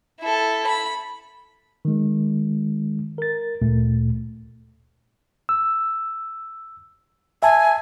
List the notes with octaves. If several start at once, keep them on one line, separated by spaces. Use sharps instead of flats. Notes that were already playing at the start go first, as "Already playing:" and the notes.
E4 A4
B5
D#3 G#3
A#4 A6
D2 A#2 A3
E6
E5 G#5 A5